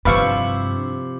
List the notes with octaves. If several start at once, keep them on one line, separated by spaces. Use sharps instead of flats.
G2 C3 F3 D4 E4 B4 F5 C#6